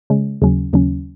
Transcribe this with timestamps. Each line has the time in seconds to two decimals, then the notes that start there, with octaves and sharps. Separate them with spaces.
0.10 C#3 G#3 C#4
0.42 D#2 C#3 F#3 C#4
0.73 D#2 C#3 F#3 C#4